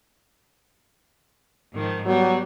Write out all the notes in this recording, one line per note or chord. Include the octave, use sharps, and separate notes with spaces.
G#2 D#3 F3
F#3 G3 B3